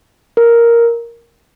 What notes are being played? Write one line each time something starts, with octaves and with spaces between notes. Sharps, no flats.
A#4